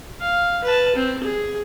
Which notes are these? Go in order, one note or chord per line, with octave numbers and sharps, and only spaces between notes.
F5
B4 A5
C4
G#4